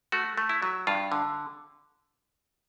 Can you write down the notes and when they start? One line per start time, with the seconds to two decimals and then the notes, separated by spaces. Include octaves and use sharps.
0.12 A3 F#4
0.38 A3
0.49 E4
0.62 F#3
0.87 G2 F4
1.12 D3